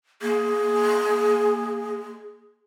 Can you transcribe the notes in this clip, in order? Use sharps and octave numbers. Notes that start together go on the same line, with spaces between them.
A#3 G#4